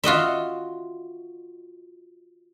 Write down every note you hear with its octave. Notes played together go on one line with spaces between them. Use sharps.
F4 F#4 D#5 E5